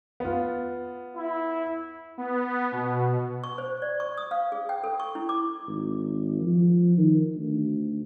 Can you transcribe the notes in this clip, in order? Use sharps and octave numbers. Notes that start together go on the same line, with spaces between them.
B3 F4
E4
B3
B2
C#6
C5
D5
C#6
D#6
F5
G#4
G5
A4
C#6
E4
D6
G#1
F3
D#3
D2